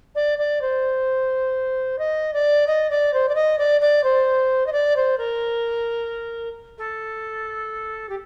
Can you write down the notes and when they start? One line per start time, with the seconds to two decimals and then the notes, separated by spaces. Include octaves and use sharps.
0.15 D5
0.38 D5
0.61 C5
1.99 D#5
2.33 D5
2.67 D#5
2.90 D5
3.13 C5
3.29 D5
3.35 D#5
3.58 D5
3.81 D5
4.04 C5
4.66 D#5
4.72 D5
4.96 C5
5.18 A#4
6.78 A4
8.09 G4